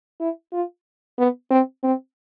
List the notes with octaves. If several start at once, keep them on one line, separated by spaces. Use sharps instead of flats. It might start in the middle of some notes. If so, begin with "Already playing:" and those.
E4
F4
B3
C4
C4